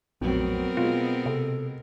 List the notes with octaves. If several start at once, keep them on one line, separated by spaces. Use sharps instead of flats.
A#1 F2 A2 F#3 B3 C4 A#4
B2 G#3 F4
C3 A4